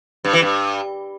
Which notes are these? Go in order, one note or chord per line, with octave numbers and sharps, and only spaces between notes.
G2
E3
G2